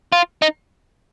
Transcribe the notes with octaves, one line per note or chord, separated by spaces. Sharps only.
F4
D#4